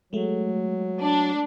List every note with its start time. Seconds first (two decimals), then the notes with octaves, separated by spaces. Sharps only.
0.13 F#3 G#3 A3
1.01 D4